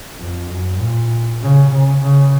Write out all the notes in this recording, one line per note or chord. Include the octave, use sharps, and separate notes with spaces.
F2
F#2
A#2
C#3
C#3
C#3